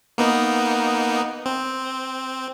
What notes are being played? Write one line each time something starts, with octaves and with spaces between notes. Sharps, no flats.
A#3 B3 D#4
C4